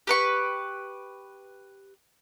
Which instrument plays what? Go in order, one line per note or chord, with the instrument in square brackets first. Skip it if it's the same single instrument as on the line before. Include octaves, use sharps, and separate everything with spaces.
[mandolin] G4 B4 C#6